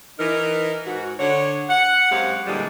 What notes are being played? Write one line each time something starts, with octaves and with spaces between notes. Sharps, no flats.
E3 D#4 A#4
G#2 F#4
D3 C#5 F#5
F#5
F#2 G#3 C4 G4 F5 F#5
A#2 D3 E3 G3 G#3